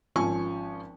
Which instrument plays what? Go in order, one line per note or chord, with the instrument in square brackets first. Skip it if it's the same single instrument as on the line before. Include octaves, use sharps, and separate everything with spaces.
[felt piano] G#1 F3 C#4 G#5 C#6